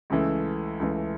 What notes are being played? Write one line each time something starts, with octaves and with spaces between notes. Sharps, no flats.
C#2 C#3 E3 A3
C#2 C#3 E3 A3